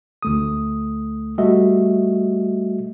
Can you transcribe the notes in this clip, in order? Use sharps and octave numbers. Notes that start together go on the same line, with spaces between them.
D2 A3 D#6
G3 A3 F#4 D#5 E5